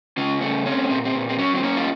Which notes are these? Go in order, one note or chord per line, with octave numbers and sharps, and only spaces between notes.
C#3 C#4 F4
A3 C#4
C4 C#4
A#2 C4
C4
A#2
C4
F#3 C#4
C4
A#3 C#4
F4